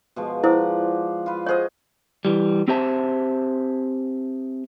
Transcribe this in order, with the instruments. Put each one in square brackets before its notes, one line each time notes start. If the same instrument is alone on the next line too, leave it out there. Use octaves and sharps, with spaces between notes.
[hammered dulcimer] B2 F3 G#3
[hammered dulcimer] F3 D5 F#5 [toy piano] E4 C5
[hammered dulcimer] F4 B4
[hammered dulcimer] F#4 G#4 D#5 [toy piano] C5 C#5
[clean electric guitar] E3 G3
C4 G4 G#4 C5 E5 A5